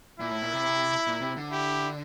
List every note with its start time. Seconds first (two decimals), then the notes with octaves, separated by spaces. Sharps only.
0.20 A#2 E4
0.31 A2
0.42 A#2
0.53 C3
1.07 A#2
1.22 C3
1.37 D3
1.51 E4 G4